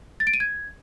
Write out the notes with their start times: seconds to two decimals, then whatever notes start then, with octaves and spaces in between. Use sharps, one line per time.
0.20 A6
0.27 D7
0.34 D#7
0.40 G#6